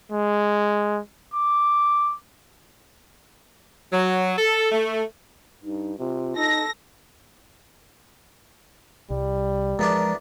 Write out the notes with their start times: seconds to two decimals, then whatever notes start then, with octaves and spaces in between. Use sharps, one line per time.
0.12 G#3
1.34 D6
3.92 F#3
4.38 A4
4.72 A3
5.64 G2 D#4
5.99 C3 F4
6.37 D#4 A4 A#6
9.10 C2 G3
9.79 E2 F3 G#3 B3 D4 A#4